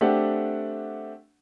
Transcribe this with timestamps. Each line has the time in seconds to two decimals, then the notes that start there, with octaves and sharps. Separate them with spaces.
0.01 A3 C4 D4 G4 F#5